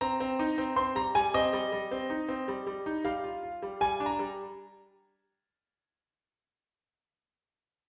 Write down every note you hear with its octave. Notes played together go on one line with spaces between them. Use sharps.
C4 A#5
C4
D#4
C4
C4 C6
G3 A#5
G3 G#5
C4 D#5
G3
G3
C4
D#4
C4
G3
G3
D#4
G3 F5
F4
F4
G3
G3 G#5
D4
A#5
G3